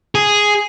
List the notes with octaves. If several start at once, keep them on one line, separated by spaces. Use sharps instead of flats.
G#4